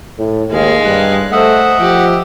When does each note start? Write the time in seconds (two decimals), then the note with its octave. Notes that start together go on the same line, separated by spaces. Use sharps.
0.18 A2
0.52 D#2 G#3 F5
0.85 G2 F#6
1.32 A3 C5 D#5 E5 F#5
1.79 F3 G4